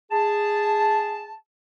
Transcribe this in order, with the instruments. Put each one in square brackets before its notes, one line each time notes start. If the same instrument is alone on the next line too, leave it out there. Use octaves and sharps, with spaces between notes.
[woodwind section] G#4 A5